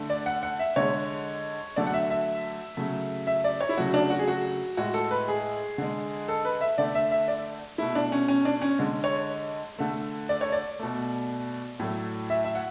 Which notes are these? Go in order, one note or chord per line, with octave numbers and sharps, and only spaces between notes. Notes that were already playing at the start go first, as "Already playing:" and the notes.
Already playing: D3 A3
D5
F#5
F#5
E5
D3 G#3 C#5
D3 F#3 A3 D5
F#5
E5
E5
C#3 F#3 A3
E5
D5
C#5
E4
C#3 F#3 A3 F#4
D4
F#4
G#4
F#4
A2 G#3 F#4
A4
B4
G#4
D3 G#3
A4
B4
E5
D3 A3 D5
E5
E5
D5
B2 A3 E4
D4
C#4
C#4
D4
C#4
D3 G#3
C#5
D3 A3
D5
C#5
D5
B2 A3
A2 F#3 A3
E5
E5
F#5